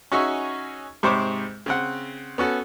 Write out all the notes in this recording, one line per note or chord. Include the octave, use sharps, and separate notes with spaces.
C#4 D#4 F#4 G#4 E5 C#6
G#2 C3 C5 C#5 B5 D6
C#3 C4 F#5
B3 C#4 F#4 A4